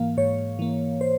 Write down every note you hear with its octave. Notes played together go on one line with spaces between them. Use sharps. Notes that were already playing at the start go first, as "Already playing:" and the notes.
Already playing: G#2 E3 A#3 F5
G#2 C#5
E3 A#3
C5